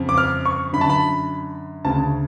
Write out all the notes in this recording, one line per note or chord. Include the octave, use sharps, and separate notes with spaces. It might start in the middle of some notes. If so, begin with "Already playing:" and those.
Already playing: F2 C#3
D6
F6
C#6
F#2 D3 B5
A5
B5
D2 C#3 A5